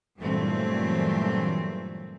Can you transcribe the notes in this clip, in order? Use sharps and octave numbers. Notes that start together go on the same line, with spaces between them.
G2 A#2 E3 F#3 A3 C4